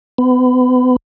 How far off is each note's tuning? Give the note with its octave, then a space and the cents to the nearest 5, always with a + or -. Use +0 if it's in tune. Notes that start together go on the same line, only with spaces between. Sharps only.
B3 +35